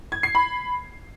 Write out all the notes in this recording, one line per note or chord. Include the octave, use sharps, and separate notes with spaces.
G#6
C7
B5